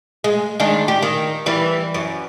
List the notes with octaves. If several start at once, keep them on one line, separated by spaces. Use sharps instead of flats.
G#3
D#3 G#3 D4
G4
D#3
E3 G3
F#2